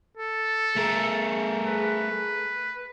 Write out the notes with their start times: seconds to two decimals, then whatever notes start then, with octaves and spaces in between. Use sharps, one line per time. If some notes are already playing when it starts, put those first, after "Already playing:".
0.17 A4
0.76 A3 G#4 A#4
1.67 B4